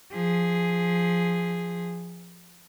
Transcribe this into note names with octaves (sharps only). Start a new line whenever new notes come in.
F3 G#4